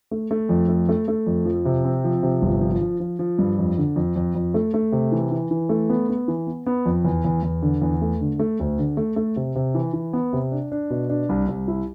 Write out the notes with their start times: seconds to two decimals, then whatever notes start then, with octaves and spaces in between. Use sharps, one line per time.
0.11 A3
0.31 A3
0.49 F2
0.68 A3
0.89 A3
1.08 A3
1.27 F2
1.46 F3
1.65 C3
1.84 C4
2.04 F3
2.23 C3
2.42 G1
2.61 F3
2.81 F3
3.00 F3
3.19 F3
3.39 G2
3.59 F2
3.78 D3
3.96 F2
4.16 F2
4.35 F2
4.54 A3
4.74 A3
4.92 C3
5.12 E3
5.31 E3
5.51 E3
5.69 A3
5.89 B3
6.09 B3
6.28 E3
6.47 B3
6.66 B3
6.86 F2
7.05 E2
7.25 E2
7.43 E2
7.62 D3
7.82 E2
8.02 A3
8.21 D3
8.39 A3
8.60 D2
8.78 D3
8.97 A3
9.16 A3
9.36 C3
9.55 C3
9.75 E3
9.93 E3
10.13 B3
10.33 C3
10.52 D4
10.72 D4
10.90 B2
11.09 D4
11.29 C2
11.48 C2
11.68 E4